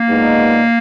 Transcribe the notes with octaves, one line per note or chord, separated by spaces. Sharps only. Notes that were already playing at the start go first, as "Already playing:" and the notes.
Already playing: A#3
A#2 G#3 B3 D#4